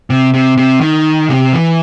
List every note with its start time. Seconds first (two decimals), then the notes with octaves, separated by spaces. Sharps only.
0.10 C3
0.34 C3
0.57 C3
0.81 D#3
1.29 C3
1.53 E3